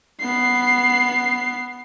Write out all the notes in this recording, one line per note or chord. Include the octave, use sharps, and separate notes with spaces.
B3 C7